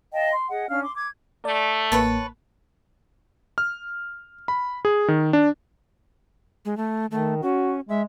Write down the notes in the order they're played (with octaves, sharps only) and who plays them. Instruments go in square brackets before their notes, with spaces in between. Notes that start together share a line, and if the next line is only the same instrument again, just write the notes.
[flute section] D#5 F5 G5 A5
C6
G#4 D#5 F#5
C#4 D4 F5 F6
C6 D6
D6 G#6
[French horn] A3 [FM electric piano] D5
[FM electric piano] A1 A#3 [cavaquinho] B4 C#5 A5
[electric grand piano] F6
B5
G#4
D#3
D4
[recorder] G#3
A3
[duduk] D#3 [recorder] A3
[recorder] C#4 [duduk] F#4
[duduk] G#3 [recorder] E5